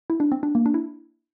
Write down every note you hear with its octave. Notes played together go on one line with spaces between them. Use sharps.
E4
D4
C4
D4
A#3
D4
E4